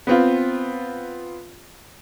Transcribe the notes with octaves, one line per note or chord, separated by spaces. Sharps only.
B3 C4 F4